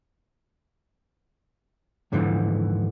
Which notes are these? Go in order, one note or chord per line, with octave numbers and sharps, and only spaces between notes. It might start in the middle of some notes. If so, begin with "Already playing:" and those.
D#2 G#2 D3 E3 F3